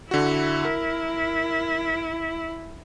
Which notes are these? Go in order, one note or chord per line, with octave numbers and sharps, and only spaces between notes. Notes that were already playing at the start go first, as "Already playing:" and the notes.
D3 E4 F#4
A#4